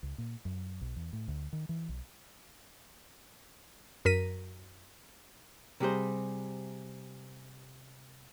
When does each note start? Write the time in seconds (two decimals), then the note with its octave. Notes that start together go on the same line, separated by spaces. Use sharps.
0.03 C#2
0.18 A#2
0.45 F#2
0.81 B1
0.96 E2
1.13 A2
1.28 D2
1.53 D#3
1.69 E3
1.89 B1
4.05 F#2 A#4 B6 D#7
5.80 C3 G3 G#4 C5